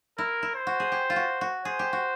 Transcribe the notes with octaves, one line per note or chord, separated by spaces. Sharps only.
E4 A#4
E4
C5
F#4
G#4
G4
F4
F#4
F#4
G#4 C5
G4
F#4